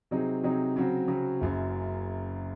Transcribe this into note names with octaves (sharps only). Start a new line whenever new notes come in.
C3 F#3 C4 D#4 G#4
C3 F#3 C4 D#4 G#4
C#3 F#3 C4 F#4
C#3 F#3 C4 F#4
F#1 F#2 C#3